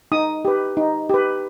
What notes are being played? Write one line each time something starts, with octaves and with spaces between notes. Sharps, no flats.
D#4 D#6
G4 B4
D#4
G4 B4